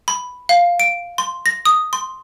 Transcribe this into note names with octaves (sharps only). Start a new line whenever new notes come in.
B5
F5
D7
C6
A#6
D#6
C6